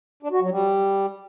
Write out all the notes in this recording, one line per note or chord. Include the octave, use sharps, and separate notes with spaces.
D4
F#4
F#3
G3